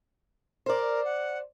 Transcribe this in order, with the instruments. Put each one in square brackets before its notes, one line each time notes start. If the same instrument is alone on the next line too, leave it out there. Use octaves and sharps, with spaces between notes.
[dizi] A#4 [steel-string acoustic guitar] C5 D5
[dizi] F#5